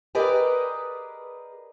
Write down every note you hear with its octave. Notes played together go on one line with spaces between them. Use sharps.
G4 G#4 A#4 B4 D5 D#5